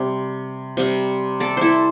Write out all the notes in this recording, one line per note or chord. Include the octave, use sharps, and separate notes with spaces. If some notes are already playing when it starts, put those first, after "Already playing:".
Already playing: C3 G3
C3 G3
A4 D5
E4 A4 C5